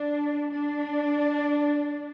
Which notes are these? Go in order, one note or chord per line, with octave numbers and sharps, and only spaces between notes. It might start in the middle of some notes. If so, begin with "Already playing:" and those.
Already playing: D4
D4